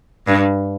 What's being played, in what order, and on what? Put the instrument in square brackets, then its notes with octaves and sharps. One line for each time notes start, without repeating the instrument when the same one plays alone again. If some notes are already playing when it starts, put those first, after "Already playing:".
[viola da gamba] G2